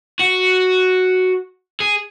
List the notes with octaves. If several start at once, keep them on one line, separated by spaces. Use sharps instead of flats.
F#4
G#4